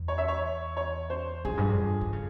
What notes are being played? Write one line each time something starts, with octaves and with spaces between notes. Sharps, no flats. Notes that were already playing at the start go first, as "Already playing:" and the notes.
Already playing: E2
C#5
E5
C#5
C#5
C5
F2 G#4
G2
F2
E3
C#3